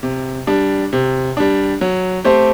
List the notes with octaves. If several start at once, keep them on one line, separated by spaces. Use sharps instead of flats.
C3
G3 D4
C3
G3 D4
F#3
A3 C4 G4 C5